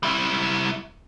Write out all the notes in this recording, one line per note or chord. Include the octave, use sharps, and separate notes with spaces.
G3 E4